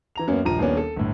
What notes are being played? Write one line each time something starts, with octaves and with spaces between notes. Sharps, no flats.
E3 A#5 F7
F#2 A#3 B3 C#4
D#1 A#1 F3 A#5 D#7
D#1 A#3 B3 C#4 D4
A4
G1 A2